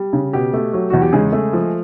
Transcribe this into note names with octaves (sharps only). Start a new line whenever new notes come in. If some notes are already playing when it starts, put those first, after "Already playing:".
Already playing: G3
C#3
B2 G4
A3
F#3
E2 F#4
G4
C#3 G#3 G#4
A3
F3